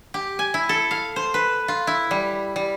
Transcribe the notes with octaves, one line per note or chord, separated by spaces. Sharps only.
G4
G#5
E4
A4
F5
C5
B4
F4
E4
G3
G3